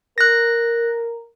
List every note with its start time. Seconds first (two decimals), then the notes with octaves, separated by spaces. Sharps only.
0.18 A#4 F#6 A#6